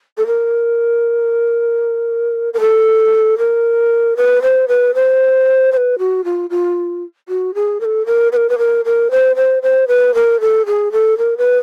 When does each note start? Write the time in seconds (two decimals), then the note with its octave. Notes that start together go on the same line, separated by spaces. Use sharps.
0.17 A4
0.27 A#4
2.54 A#4
2.60 A4
3.38 A#4
4.17 B4
4.42 C5
4.68 B4
4.95 C5
5.72 C5
5.77 B4
5.99 F#4
6.24 F4
6.50 F4
7.29 F#4
7.54 G#4
7.80 A#4
7.85 A4
8.06 A#4
8.32 B4
8.36 A#4
8.49 B4
8.58 A#4
8.85 A#4
9.11 C5
9.36 C5
9.62 C5
9.88 B4
10.14 A#4
10.40 A4
10.66 G#4
10.92 A4
11.18 A#4
11.38 B4